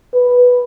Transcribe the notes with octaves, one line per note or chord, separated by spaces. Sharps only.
B4